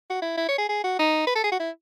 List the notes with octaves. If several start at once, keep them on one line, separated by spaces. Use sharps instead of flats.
F#4
E4
E4
C#5
G#4
G#4
F#4
D#4
B4
A4
G#4
F#4
E4